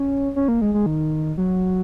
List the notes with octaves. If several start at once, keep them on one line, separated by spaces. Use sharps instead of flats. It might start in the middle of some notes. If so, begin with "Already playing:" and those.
Already playing: C#4
C#4
A#3
G#3
G#3
D#3
F#3